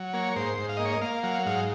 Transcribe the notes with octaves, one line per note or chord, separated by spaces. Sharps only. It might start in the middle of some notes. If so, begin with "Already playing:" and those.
Already playing: F#3
A#3 C#5
G#2 C5
G#2
F5
A#3 D#5
C#5
D#5
A#3 F5
F#3 F5
G#2 F5